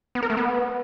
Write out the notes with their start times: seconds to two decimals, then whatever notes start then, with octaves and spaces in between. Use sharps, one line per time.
0.15 B3
0.23 A#4
0.30 A3
0.37 B3